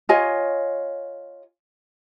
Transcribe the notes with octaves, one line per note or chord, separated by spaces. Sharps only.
F4 C#5 D#5 G#5